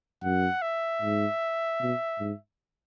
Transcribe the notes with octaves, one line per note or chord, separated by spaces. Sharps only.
F#2 F#5
E5
G#2
B2
G#2